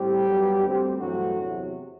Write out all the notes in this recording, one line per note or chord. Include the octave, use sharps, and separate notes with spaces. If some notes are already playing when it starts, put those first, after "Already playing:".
Already playing: A2 G3 C4 G4
G2 F#3 B3
D2 D3 G3 C4
G2 E3 F#3 A3 C4 F#4
E2 C3 F#3